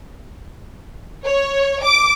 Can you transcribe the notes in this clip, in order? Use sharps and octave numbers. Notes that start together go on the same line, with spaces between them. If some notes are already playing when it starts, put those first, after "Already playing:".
C#5
D6